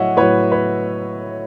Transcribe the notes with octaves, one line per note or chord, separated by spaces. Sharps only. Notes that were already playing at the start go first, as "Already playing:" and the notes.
Already playing: A2 F#3 C#5 D#5 E5 F#5
A2 F#3 B4 C#5
B4 C#5